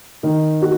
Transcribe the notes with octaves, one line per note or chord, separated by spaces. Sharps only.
D#3 D#4
F#4